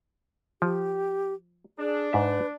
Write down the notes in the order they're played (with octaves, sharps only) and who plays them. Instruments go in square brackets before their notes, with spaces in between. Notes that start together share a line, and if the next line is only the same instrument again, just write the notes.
[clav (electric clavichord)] F3 [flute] G4
[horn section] D4 [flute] G#4
[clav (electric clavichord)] G#2 E5 [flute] B4